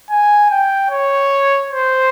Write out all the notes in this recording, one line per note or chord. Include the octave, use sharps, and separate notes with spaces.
G#5
G5
C#5
C5